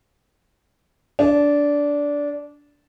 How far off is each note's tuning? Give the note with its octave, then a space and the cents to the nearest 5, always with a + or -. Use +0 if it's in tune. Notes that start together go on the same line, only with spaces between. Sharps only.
D4 -15